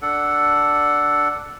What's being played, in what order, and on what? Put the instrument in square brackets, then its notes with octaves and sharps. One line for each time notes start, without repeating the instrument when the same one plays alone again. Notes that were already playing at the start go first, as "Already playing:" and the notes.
[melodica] D4 A4 F#5